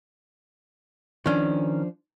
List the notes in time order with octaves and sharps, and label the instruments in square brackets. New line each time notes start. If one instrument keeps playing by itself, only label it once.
[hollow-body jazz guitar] D#3 C#4 [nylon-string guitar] F3 D4